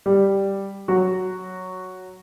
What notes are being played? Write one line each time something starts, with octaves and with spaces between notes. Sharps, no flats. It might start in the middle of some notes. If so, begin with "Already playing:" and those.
G3 G4
F#3 F#4